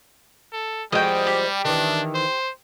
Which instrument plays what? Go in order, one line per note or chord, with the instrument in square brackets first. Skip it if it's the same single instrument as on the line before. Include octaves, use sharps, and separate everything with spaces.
[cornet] A4
[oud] F3 G#3 F#4 [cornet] G3 [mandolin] D#5 G5
[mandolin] G4
[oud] D#3 E3 [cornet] D4
[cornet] C5